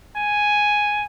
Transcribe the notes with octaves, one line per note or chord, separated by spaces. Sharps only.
G#5